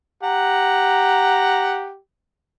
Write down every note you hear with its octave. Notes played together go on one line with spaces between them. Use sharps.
G4 F#5 A#5